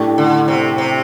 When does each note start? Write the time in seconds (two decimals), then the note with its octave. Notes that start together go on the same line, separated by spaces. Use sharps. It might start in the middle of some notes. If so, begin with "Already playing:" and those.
Already playing: A2 A3 D4 G4
0.18 D3
0.48 C3
0.78 C3